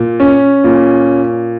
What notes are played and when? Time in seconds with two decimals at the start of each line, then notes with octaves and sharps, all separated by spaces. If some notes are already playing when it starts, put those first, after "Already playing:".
Already playing: A#2
0.20 C#4
0.64 A#2